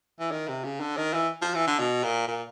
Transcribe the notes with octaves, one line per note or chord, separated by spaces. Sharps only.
E3
D#3
C3
C#3
D3
D#3
E3
F3
E3
D3
B2
A#2
A#2